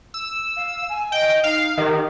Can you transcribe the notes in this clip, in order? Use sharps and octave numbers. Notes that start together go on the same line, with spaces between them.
E6
F5
G#5
D#5 G5
D#4 F5
D#3 G4